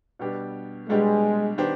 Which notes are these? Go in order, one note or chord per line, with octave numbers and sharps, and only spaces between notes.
B2 G3 B3 D4 G4
B2 G3 G#3 B3 D4 G4
D#3 B3 D4 G4 C5